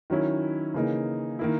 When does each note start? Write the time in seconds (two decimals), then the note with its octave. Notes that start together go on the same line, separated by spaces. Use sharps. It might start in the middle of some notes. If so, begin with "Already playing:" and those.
0.10 D#3 F#3 C#4 E4
0.74 C#3 E3 A#3 D#4
1.39 D#3 A#3 E4